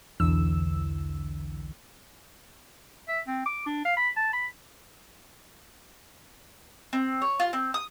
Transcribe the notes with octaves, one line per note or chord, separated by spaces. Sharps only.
B1 E2 D3 E3 E6
E5
C4
D6
D4
F5
B5
A5
B5
C4
C#5
F4
C4
D#6